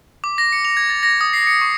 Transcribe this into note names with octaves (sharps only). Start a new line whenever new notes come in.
D6
A#6
C#7
F7
G#6
A6
A#6
D#6
C7
C#7
C#6